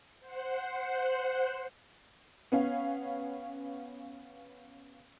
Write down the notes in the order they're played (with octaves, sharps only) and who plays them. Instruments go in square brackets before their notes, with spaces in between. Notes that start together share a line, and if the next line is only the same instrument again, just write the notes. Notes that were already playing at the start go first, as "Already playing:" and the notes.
[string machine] C5 F#5
[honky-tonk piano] B3 C#4 F5